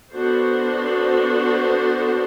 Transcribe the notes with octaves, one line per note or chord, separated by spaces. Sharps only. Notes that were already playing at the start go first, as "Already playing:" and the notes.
B3 D4 F#4 A4 C5